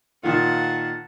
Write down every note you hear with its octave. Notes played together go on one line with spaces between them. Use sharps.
A#2 D#3 F4 F#5 A5